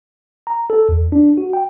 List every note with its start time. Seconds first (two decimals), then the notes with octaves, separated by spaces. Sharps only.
0.47 A#5
0.70 A4
0.89 E2
1.12 D4
1.38 F#4
1.53 G5